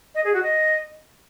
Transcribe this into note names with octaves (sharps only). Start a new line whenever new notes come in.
D#5
G#4
F#4
D#5